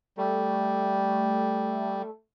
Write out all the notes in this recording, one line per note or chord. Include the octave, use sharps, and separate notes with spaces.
G3 A3